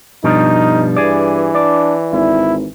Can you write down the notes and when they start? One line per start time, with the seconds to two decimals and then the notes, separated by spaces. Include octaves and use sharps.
0.24 G2 B2 F3 G3 D#4
0.97 E3 G#4 D5
1.55 D4 D5
2.13 G#1 E4